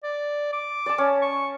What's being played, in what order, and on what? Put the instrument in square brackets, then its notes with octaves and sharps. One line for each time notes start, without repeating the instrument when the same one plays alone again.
[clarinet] D5
D6
[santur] D5 A5
C#4
[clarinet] C#6